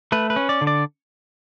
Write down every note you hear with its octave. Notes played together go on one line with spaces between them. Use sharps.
A3 B4
B4
C#4
D5
D3
D5